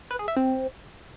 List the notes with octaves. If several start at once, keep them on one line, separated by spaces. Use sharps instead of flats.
B4
G#4
E5
C4